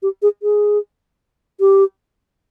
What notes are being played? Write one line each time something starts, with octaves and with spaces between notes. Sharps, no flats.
G4
G#4
G#4
G4